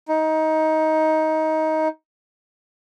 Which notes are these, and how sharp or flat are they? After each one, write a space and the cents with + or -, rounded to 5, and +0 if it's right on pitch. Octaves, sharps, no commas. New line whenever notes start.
D#4 +20